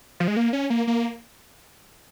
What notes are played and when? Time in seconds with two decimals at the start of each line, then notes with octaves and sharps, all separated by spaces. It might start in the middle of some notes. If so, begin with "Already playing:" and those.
0.20 F3
0.28 G#3
0.36 A#3
0.53 C#4
0.70 A#3
0.87 A#3